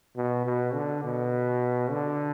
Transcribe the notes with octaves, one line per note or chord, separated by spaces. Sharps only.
B2
B2
D3
B2
D3